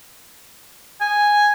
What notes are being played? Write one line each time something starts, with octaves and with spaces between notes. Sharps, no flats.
G#5